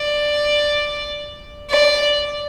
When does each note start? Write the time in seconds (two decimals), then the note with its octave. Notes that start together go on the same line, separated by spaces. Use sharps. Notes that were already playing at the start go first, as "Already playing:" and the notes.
Already playing: D5
1.70 D5